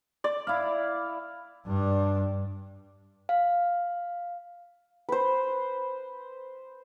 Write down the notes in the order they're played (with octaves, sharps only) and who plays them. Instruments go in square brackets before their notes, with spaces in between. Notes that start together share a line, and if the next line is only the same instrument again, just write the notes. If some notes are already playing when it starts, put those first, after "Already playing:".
[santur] D5
[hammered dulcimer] E4 F5
[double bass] G2 D4
[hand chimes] F5
[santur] B4 C5